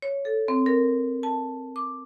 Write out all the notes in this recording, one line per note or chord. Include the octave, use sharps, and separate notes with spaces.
C#5
A4
C4
A#4
A5
D6